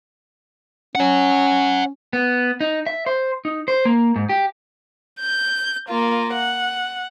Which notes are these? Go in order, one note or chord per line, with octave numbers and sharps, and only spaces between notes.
C#4 C#5 F#5
B3
D#4
E5
C5
D#4
C5
A#3
G#2
G4
G6
A#3 F4
F#5